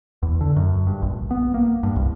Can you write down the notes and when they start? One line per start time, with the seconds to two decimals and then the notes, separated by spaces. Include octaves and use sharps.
0.23 E2
0.41 D3
0.56 F#2
0.87 G2
1.02 A#1
1.31 B3
1.54 A#3
1.83 G2
1.96 C2